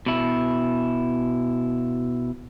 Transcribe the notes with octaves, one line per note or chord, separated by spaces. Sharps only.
B2 E4